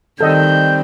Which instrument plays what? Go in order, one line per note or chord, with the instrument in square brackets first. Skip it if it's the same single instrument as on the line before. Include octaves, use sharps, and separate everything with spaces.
[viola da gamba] D#3 [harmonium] G3 C4 [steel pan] A4 D#5 [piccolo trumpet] G6